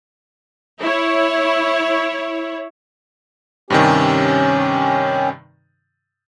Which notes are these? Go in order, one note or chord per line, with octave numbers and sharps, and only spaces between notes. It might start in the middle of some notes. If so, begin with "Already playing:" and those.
E4 C#5
G2 C3 D#3 C#4 G4